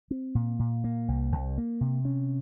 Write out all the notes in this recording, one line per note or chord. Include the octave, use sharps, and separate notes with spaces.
C4
A#2
A#2
A#3
C2
C2
A#3
C3
C#4